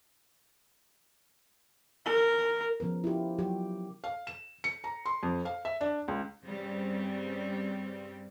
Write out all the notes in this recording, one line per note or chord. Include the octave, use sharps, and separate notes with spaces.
A#4
C#3 F3 B3 A#4
E4 F4 G4
F#3 F#4 G4
F5
E7
C#7
A#5
C6
F2
F5
E5
D4
C#2
G2 C#3 G3 C4